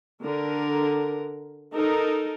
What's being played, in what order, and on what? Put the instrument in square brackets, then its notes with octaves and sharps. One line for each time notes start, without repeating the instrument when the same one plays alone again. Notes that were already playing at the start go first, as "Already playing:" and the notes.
[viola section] D3 A#4
D#4 A4 A#4